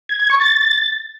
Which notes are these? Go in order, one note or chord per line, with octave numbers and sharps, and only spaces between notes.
G#6
G#6
C#6
A6